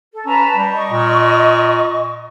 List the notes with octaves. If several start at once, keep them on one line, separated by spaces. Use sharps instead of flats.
A4
C#4 B4 A5 A#5
G3
D#5 C#6
A#2